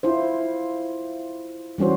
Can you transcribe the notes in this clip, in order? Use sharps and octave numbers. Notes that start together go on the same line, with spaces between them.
E4 F4 C5
E3 G3 C#4 F#4 C5